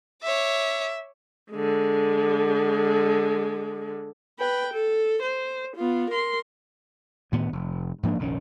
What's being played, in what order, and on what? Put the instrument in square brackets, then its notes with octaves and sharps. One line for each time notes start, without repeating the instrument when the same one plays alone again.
[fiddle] C#5 D6 [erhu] E5
[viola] D3 G#3
B4 G5
A4
C5
B3 F4
A#4 C6
[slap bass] D2 A2 D#3 B3
F1
G#2 F3 A#3 D4
F1 A#1 D#3 C#4